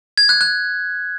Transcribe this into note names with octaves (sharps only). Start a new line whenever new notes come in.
G#6
F#6
F#6